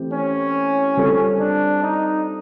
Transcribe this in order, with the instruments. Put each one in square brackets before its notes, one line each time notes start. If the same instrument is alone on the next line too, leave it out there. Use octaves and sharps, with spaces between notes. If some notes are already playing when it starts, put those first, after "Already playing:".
Already playing: [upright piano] E3 A3 C4 G4
[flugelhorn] C#4
[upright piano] G3 C4 F4 A4
[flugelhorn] D4
D#4